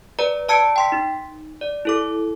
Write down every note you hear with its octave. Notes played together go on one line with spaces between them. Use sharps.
B4 D5 A#5
D5 A5 E6 G#6 C#7 D7
G5 C6 B6
D#4
D5
E4 A4 D6